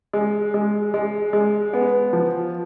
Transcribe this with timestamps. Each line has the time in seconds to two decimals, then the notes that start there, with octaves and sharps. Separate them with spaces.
0.13 G#3
0.54 G#3
0.94 G#3
1.33 G#3
1.73 B3
2.13 F3